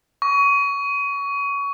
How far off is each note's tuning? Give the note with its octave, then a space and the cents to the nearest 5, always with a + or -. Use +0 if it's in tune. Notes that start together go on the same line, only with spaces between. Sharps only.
C#6 +25